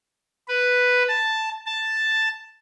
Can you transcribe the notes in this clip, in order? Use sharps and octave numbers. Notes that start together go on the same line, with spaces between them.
B4
A5
A5